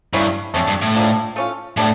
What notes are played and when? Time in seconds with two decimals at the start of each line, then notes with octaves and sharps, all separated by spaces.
0.13 G2 A#3 C#4 E4
0.54 F2 D3 A3 C#4
0.68 G2
0.81 A2
0.95 F3 A#3 D4 F4
1.36 A3 C#4 F4
1.77 A2 G3 D4 A4